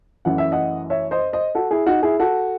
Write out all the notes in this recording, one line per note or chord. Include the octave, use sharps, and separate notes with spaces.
F#2 E3 A3 C#4 F#5
E5
D#5 F#5
C#5 E5
C5 D#5
C5 D#5
F#4 A4
E4 G#4
D#4 F#4
E4 G#4
F#4 A4